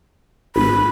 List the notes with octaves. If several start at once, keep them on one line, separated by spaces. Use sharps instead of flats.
G#1 B5